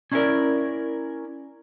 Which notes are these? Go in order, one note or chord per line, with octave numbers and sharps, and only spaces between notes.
C#4 D4 E4 F#4 A#4 D5